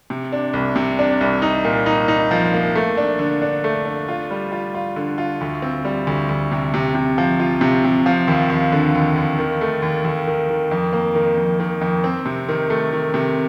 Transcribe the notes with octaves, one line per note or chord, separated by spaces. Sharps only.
C3
D4
C2
C3
D4
C2
D#4
A#2
D#4
D#4
F3
A#3
A3
D4
D3
D4
A3
D4
F4
G3
F4
F4
D3
F4
D2
C4
G3
D2
D2
C3
C3
C3
F3
F4
C3
C3
F3
D#2
D#2
D3
D#2
D#2
D#3
A3
D#2
D#2
D#3
D#3
F2
A#3
D#3
F2
D#3
F2
C4
C3
D#3
A3
D#3
C3